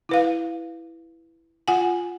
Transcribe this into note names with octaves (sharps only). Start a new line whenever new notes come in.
E4 B4 F5
F4 F#5 G#5